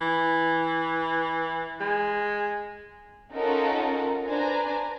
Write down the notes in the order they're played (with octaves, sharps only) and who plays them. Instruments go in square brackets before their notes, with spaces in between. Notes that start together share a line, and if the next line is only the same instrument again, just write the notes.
[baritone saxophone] E3
G#3
[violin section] C#4 D#4 F4 A4 A#4 F#5
D4 B4 C5 G#5 A#5